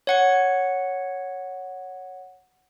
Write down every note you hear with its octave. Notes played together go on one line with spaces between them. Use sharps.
C#5 F#5 C#7